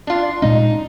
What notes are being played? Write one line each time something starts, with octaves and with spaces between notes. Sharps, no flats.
D4 F4
A#2 G#3 C#4 D#4